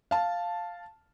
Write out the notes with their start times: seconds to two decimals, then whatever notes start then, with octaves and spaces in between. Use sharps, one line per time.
0.11 F5 A5